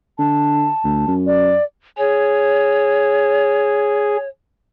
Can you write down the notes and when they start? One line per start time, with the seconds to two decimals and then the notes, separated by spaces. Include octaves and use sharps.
0.19 D3 A5
0.84 D2
1.08 F#2
1.27 D5
1.98 G#4 C#5